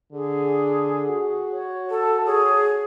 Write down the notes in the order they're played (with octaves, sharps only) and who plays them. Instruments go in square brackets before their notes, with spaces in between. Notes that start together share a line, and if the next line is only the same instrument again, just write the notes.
[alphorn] D3 [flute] G#4
[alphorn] F#4
[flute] C#5
[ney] A4 [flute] A5
[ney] G#4 [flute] C#5